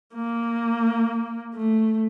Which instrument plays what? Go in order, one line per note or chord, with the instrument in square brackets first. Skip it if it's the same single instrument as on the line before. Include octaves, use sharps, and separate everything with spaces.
[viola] A#3
A3